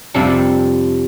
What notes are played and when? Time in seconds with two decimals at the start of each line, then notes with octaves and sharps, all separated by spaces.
0.14 F2 C3 G3 D4 A4